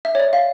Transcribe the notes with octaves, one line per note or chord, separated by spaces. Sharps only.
E5
C#5
D5
F5